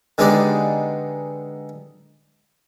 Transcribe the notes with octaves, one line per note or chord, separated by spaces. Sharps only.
D3 G#3 B3 D#4 G4 D5